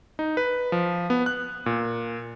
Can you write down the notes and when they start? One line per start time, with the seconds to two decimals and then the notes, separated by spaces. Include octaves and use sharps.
0.19 D#4
0.37 B4
0.72 F3
1.10 B3
1.26 F#6
1.66 A#2